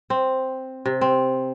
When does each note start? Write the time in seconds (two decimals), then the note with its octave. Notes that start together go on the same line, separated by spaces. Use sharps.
0.10 C4
0.86 C3
1.01 C4